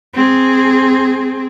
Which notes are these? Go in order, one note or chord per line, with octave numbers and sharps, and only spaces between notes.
C4 G#4